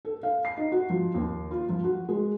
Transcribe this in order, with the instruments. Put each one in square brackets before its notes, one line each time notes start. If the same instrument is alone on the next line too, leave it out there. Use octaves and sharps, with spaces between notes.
[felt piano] A4
F5
C7
D#4
F#4
F3
D#2
F4
F3
F#4
G#3